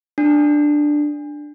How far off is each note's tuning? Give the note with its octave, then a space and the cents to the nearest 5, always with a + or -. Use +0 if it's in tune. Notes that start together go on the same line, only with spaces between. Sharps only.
D4 +10